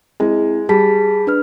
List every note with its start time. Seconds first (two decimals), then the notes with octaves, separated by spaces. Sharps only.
0.20 G#3 C4 E4
0.69 G3 G#4 A5 B6
1.27 D4 B4 F6